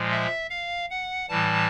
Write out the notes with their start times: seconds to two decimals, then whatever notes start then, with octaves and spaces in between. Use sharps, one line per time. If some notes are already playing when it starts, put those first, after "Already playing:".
Already playing: A#2 F3 G#3
0.11 E5
0.50 F5
0.91 F#5
1.29 A2 E3 G3 A5